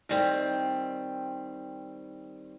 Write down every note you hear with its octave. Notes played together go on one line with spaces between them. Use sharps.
D#3 G3 C4